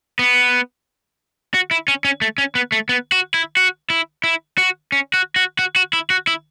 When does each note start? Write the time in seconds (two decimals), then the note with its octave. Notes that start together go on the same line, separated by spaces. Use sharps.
0.19 B3
1.54 F#4
1.71 E4
1.88 C#4
2.05 C#4
2.21 A3
2.38 C#4
2.55 B3
2.72 A3
2.89 B3
3.12 F#4
3.34 E4
3.57 F#4
3.90 E4
4.24 E4
4.58 F#4
4.92 C#4
5.14 F#4
5.36 F#4
5.59 F#4
5.76 F#4
5.93 E4
6.10 F#4
6.27 E4